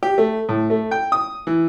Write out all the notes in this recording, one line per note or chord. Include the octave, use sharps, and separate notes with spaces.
G4
A3
A2
A3
G5
D#6
E3